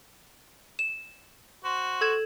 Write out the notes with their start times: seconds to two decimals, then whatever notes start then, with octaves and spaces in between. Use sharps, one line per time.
0.79 E7
1.64 F#4 C5
2.01 A4 G#6 E7